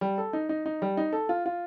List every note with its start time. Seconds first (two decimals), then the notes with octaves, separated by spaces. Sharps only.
0.01 G3
0.18 A4
0.33 D#4
0.49 D#4
0.66 D#4
0.82 G3
0.97 D#4
1.13 A4
1.29 F4
1.46 F4